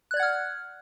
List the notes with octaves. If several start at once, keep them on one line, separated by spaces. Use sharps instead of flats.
D5 F#5 F6 F#6 G#6